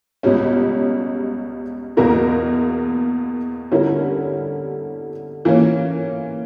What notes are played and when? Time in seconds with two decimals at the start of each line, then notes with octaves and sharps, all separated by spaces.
0.23 C#2 B2 G3 C#4
1.97 E2 B2 A#3 E4 A#4
3.72 D3 G3 C#4 E4 A#4
5.45 E3 A#3 C#4